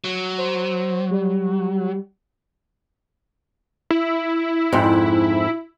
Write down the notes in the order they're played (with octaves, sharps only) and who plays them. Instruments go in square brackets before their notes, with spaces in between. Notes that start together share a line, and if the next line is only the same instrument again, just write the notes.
[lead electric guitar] F#3
[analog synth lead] C5
G3
[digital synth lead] E4
[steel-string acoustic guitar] F2 G#2